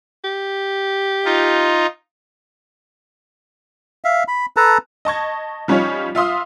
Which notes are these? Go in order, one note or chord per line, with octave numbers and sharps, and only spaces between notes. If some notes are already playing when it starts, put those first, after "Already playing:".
G4
D#4 F4
E5 F5
B5
A4 B4 A5 A#5
D#5 A5 C#6 G#6
F3 G3 C#4 D#4 F4 C#5
F4 E5 F5 C6 D#6